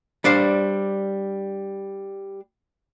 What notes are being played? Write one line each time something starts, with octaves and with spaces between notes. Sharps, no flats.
G3 D4 C5 F5